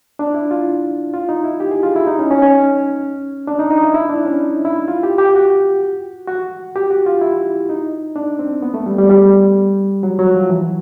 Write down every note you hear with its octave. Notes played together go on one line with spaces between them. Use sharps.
D4
E4
F4
F4
D#4
E4
G4
G#4
F4
E4
D#4
C#4
C#4
C#4
D4
D#4
D#4
E4
E4
D4
C#4
D#4
E4
F4
G4
G4
F#4
F#4
G4
F#4
F4
E4
D#4
D4
C4
B3
A3
G3
G3
G3
F#3
F#3
F3
E3